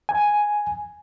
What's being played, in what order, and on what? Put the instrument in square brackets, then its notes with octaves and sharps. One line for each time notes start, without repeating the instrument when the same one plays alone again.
[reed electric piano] G#5